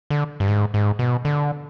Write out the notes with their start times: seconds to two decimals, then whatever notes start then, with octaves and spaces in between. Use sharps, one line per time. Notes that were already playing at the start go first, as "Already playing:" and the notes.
0.10 D3
0.40 G2
0.48 G#2
0.74 G#2
0.99 B2
1.25 D3